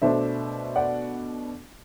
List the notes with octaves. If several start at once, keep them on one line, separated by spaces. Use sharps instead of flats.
B2 A3 D4 C5 E5
D5 F#5